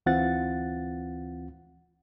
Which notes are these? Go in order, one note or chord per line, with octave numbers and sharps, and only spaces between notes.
D2 E3 C4 F4 F#5 A6